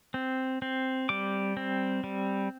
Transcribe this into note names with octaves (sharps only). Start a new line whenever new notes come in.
C4
C4
G3 D6
C4
G3